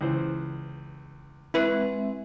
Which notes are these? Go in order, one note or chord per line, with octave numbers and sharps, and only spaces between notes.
C#2 E3 C5
G#3 C4 E4 B4 E5